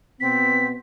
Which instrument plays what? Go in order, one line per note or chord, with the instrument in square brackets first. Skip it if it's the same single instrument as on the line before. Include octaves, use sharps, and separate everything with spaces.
[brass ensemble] B2 B3 [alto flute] C4 [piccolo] B6